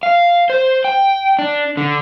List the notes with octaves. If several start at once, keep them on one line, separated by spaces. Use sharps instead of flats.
F5
C5
G5
D4
D3